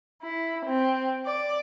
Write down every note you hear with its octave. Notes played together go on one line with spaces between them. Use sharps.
E4
C4
D5